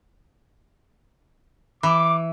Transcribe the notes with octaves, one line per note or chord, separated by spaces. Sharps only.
E3 D6